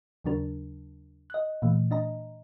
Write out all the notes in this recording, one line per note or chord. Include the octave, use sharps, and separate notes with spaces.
D#2 C#3 F#3 D4 A#4
D#5 F#6
A#2 E3 A3
D4 D#5 A#5